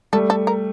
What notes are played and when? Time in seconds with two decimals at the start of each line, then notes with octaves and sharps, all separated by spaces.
0.13 G3 A3 A4
0.30 A4
0.47 A#4